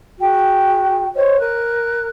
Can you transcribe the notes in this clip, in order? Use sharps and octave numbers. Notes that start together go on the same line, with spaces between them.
F#4 G#4 G5
C5 C#5 D#5
A#4 F#6